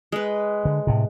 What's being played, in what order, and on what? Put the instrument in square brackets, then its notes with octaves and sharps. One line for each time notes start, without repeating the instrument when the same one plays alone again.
[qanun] G#3 B4
[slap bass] D3
A2 C3